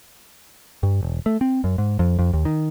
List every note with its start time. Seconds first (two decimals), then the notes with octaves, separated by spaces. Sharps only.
0.83 G2
1.03 E1
1.26 A3
1.41 C4
1.64 F#2
1.78 G#2
1.99 F2
2.19 F2
2.33 D#2
2.45 D#3